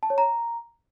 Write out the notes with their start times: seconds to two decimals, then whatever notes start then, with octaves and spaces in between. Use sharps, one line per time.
0.03 A5
0.10 C#5
0.18 A#5